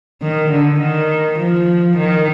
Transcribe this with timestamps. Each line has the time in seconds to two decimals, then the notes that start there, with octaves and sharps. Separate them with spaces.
0.22 D#3
0.51 D3
0.80 D#3
1.39 F3
1.97 D#3